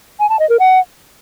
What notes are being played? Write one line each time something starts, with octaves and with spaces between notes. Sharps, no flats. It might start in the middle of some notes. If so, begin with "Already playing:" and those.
G#5
A5
D#5
A#4
F#5